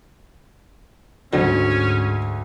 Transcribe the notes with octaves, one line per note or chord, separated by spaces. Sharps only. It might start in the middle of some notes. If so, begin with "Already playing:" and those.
D2 G#2 D3 F3 G3 C#4